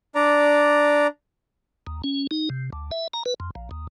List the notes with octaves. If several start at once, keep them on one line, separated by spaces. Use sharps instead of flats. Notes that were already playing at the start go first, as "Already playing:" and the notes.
D4 D5 A#5
D#2
C#4
D#4
C3
D2
E5
A#5
B4
F2
A#1
D#2